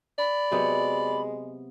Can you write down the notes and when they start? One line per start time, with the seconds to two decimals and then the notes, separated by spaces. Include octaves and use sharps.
0.19 D5 B5
0.52 C3 F#3 G#3 B3